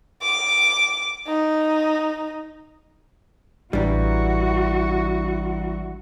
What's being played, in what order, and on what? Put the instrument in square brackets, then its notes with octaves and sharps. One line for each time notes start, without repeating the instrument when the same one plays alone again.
[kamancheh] D6
D#4
[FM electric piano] A1 D4 A#5 [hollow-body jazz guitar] E3 G3 [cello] E4 F#4